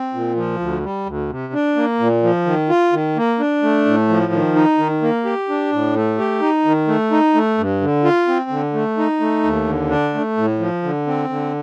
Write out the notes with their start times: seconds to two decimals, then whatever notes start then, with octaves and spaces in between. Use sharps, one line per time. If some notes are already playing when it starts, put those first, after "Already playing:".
Already playing: C4
0.14 A#2
0.36 F3
0.60 D2
0.83 G3
1.06 D2
1.30 C3
1.53 D4
1.76 A#3
1.99 A#2
2.23 F3
2.46 D#3
2.70 F4
2.93 D#3
3.16 A#3
3.39 D4
3.62 A3
3.86 A2
4.09 F3
4.33 D#3
4.55 D#4
4.78 D#3
5.02 A#3
5.25 G4
5.49 D4
5.72 A2
5.95 A3
6.18 G4
6.41 D#4
6.65 D#3
6.88 A3
7.11 D#4
7.34 A3
7.58 G2
7.81 D3
8.04 F4
8.28 C4
8.50 D3
8.73 A3
8.97 D#4
9.20 A3
9.43 D#2
9.66 D3
9.90 D4
10.14 A3
10.37 A2
10.59 F3
10.83 D3
11.07 C4
11.29 D3